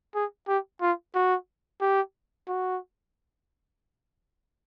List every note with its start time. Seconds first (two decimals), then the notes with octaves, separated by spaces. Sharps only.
0.15 G#4
0.48 G4
0.81 F4
1.15 F#4
1.81 G4
2.48 F#4